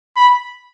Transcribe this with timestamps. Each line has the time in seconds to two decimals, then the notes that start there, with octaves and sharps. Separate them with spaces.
0.16 B5